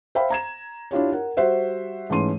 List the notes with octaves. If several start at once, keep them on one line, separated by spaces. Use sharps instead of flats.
C5 E5 F5 G5 B5
A#5 G#6 E7
D4 E4 F4 G4 C#5
A#4 F#5
G3 F#4 C5 E5 F#5
G#2 E3 A3 C#4 C6 D#7